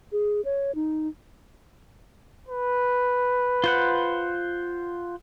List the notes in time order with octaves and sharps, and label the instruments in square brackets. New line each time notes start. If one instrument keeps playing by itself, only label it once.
[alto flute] G#4
C#5
D#4
[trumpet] B4
[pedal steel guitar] F4 C5 F#5